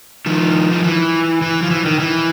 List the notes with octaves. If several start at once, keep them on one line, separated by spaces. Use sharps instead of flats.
D#3 F3
D#3
E3
E3
F3
E3
D#3
E3